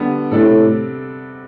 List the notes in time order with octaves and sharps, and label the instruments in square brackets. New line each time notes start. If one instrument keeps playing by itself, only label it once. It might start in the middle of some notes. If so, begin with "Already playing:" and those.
Already playing: [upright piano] D3 G3 B3
[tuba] A2 [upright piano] C3 G3 D4 A4